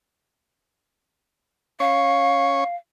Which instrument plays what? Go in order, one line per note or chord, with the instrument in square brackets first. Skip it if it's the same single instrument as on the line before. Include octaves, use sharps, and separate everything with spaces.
[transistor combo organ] C#4 C#5 [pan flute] F5